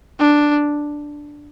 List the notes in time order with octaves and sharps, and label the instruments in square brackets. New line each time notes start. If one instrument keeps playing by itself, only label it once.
[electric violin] D4